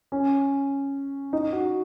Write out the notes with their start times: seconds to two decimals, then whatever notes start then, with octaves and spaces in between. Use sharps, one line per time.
0.12 C#4
1.33 D#4
1.53 F#4